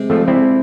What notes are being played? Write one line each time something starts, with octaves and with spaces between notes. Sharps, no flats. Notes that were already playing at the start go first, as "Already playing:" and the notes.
Already playing: C3 G#3
F3 A3
C4 E4